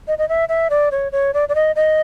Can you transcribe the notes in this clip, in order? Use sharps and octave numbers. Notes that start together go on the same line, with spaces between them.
D#5
D#5
E5
E5
D5
C#5
C#5
D5
D5
D#5
D#5